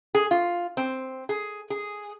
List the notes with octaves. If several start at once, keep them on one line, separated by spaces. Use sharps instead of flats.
G#4
F4
C4
G#4
G#4